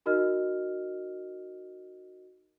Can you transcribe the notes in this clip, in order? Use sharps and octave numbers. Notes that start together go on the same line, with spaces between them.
D#4 F#4 A#4 D#5 F6